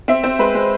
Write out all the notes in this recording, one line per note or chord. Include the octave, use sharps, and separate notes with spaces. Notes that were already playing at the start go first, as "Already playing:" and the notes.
C4 E5
C4 C5
G#3 B4
G#3